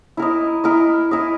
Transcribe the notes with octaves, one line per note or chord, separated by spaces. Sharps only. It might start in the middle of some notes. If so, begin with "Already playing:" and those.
E4 A#4 D#5
E4 A#4 D#5
E4 A#4 D#5